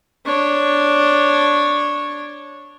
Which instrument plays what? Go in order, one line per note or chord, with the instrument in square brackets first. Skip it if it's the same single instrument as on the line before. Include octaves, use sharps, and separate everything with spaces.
[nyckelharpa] D4 C#5